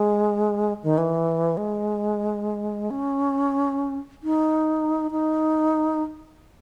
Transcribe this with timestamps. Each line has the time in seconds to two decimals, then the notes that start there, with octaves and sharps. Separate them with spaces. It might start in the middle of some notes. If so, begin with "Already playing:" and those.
Already playing: G#3
0.83 D#3
0.98 E3
1.57 G#3
2.90 C#4
4.23 D#4
5.11 D#4